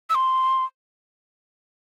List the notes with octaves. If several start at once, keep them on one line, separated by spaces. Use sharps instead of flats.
E6
C6